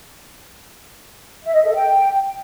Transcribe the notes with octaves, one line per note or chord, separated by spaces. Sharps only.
E5
D#5
A4
G5